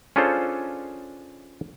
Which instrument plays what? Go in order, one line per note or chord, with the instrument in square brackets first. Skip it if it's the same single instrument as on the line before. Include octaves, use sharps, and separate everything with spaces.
[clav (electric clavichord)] C#4 D4 F4 G#4 A4 C5